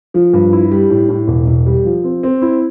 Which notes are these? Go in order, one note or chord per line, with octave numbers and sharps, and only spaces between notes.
F3
G2
E4
G3
A2
A2
E1
E1
G3
F3
C4
C4
E4